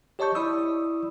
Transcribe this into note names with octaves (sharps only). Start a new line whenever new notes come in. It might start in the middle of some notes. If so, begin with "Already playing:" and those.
G4 C#5 D#5 A5 C#6 G6
E4 D5 B5 C#6 D#6 E6